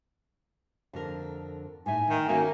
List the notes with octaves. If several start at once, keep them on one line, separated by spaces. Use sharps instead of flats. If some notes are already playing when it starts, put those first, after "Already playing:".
F2 D3 A#4
A2 D#4 E5 G#5
D#3
A#3 C#4 F#4 E5 G#5